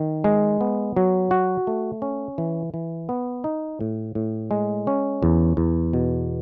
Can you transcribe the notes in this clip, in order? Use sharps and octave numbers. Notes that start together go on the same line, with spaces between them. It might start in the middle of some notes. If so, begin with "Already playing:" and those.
Already playing: D#3
G#3
B3
F#3
F#4
A3
C#4
E3
E3
B3
D#4
A2
A2
G#3
C#4
E2
E2
B2